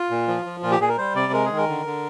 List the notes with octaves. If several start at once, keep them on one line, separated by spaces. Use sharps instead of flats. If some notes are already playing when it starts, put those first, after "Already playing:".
Already playing: F4
A#2
F3
F3
A#2 F4
G4
A#2 G#4
A#4
G3 C5
C3 D5
G#3 A#4
G#4
D#3
A#4
D3
D3